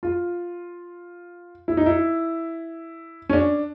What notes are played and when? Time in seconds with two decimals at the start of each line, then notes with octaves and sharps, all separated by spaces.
0.03 F4
1.68 E4
1.77 D#4
1.86 E4
3.29 C#4
3.33 D4